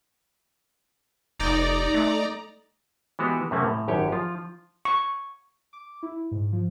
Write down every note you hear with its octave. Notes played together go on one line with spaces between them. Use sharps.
F1 D#4 D5 A#5
A3
E3 G#3 B3 F#4 G4
F#2 C3 A3 A#3 C4 C#4
A2
G#1 F#2 G4 C#5
F3 F4
C#6
D6
E4
G#2
F3